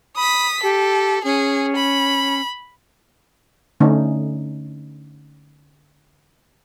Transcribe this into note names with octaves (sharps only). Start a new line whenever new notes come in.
B5 D#6 B6
G4 A4
C#4 G#4
B5
D3 A3 C#4 D#4